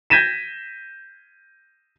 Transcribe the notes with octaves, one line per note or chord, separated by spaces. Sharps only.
G6 G#6 A#6 B6 D#7 E7